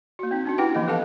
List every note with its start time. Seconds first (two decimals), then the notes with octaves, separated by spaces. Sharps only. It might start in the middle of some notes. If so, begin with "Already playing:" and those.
0.19 A#3 F#4
0.31 C4 D#4
0.46 C#4 D4 F#4
0.58 E4 G4 B4 F#5 G5
0.75 E3 F3 A#3 D#5
0.87 B3 G4 A4 B4 F5 A5